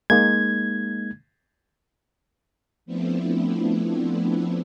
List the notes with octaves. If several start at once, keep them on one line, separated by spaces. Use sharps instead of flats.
G#3 A#3 D#4 G#6
F3 A3 B3 C4 D4 E4